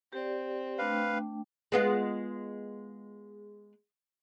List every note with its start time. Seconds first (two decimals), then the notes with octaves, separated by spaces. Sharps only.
0.13 C4 G4 D5
0.78 A3 D4 B4 F5 G5
1.72 G#3 B3 F4